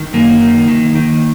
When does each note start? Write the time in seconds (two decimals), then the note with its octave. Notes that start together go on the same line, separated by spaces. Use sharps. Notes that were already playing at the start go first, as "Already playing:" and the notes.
Already playing: D#3
0.13 F#2 A#3
0.40 D#3
0.68 D#3
0.95 D#3